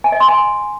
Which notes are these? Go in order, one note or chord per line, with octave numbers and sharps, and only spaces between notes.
G#5
D#5
C6
G#5